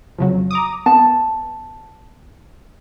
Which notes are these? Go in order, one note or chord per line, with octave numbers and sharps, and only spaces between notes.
F2 C#3 F#3
A#5 D6 D#6
B3 A5